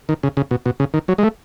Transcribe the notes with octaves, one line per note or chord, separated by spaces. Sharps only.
D#3
C#3
C#3
B2
B2
C#3
D#3
F#3
G#3
A3